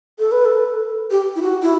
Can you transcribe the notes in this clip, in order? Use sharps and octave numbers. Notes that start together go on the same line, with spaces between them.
A4
B4
A4
G4
E4
F#4
E4